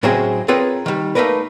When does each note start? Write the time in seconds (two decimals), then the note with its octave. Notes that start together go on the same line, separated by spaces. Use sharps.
0.03 A2 C#3 F#3 G#3 C4 G#4
0.48 C4 F4 G#4 A#4 B4 C#5
0.86 D#3 G3
1.15 A3 A#3 D#4 A#4 B4